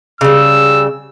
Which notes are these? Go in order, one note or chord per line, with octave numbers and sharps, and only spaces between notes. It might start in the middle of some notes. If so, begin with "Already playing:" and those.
C#3 G3 E6